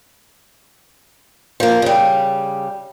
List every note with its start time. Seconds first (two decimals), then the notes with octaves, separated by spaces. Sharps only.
1.60 F3 A#3
1.82 C#3 G3